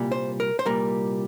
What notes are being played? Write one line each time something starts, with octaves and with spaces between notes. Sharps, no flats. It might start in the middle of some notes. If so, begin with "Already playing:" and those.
Already playing: C2 A#2 G3
C5
A#4
C5
C2 A#2 G3 A#4